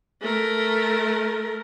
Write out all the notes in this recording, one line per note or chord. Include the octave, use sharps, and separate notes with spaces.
A3 A#4